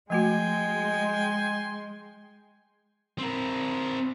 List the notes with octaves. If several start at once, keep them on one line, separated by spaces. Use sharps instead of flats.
F3 G#3 A3 F#4 G5 G#5 C6
C4 A#4